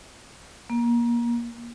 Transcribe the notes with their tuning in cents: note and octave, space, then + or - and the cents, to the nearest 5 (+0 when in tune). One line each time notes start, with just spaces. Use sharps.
A#3 +25